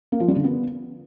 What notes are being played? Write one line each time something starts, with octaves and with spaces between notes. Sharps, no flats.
A#3
F3
G3
D3
B3